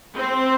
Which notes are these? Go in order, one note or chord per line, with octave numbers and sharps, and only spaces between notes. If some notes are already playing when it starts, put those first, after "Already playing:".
C4